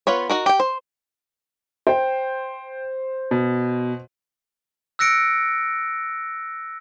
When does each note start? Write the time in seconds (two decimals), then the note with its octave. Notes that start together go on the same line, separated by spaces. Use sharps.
0.07 B3 F4 B4 C#5
0.29 D#4 F#4 A#4
0.46 G4 G5
0.60 C5
1.87 C5 G5
3.31 B2
4.99 E6 F#6 A#6 C#7 D7